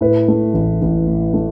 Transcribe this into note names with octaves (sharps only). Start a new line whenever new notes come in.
A2 B4
A3
A1
A1
A2
A3